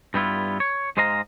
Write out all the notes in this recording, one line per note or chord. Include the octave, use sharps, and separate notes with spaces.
G2 G3 B3 E4 F4
C#5
G#2 G#3 C5 D#5 F5 A#5